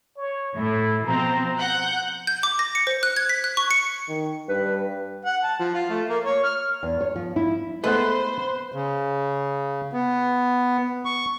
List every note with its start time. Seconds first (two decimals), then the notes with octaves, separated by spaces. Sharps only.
0.17 C#5
0.56 A2 E4
1.07 B2 F3 C4 A#5
1.58 F#5 F#6 G6
2.27 G6
2.43 D6
2.59 A#6
2.75 C#7
2.87 C5
3.03 F#6
3.16 G#6
3.29 B6
3.44 F#6
3.57 C#6
3.71 C#7
4.08 D#3
4.49 G2 B4
5.25 F#5
5.44 A5
5.59 F3
5.74 F4
5.90 A3
6.09 A#3
6.23 C#5
6.44 F6
6.83 E2
7.01 C#5
7.16 F3
7.36 E4
7.84 G#3 A3 B3 B4 C5 C6
8.72 C#3
9.93 B3
11.05 C#6